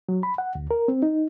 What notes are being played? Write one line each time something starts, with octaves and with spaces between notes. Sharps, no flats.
F#3
B5
F#5
D2
A#4
C4
D#4